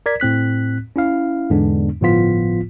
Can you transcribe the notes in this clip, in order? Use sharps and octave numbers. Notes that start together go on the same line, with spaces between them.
A#4 D5 G#6 B6
A2 C4 F#6 B6
C#4 E4 F5
E2 G#2 D3 G#3 B3 D4
G1 A2 F3 B3 F4 B6